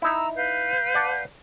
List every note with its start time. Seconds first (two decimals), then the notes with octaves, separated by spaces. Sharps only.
0.02 D#4 E4 A#5 E6
0.36 B4 F5 G6
0.95 D5 F#5 A5